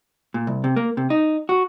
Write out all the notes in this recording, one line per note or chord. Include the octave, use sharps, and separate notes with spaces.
A#2
C2
C3
A#3
C3
D#4
F#4